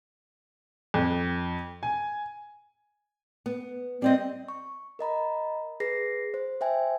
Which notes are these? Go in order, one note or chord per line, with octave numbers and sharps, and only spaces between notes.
F2
G#5
B3
G3 C4 D5 D#5
C#6
A#4 D#5 A#5 B5
G#4 B4 A#6 C7
C5
C5 E5 G5 G#5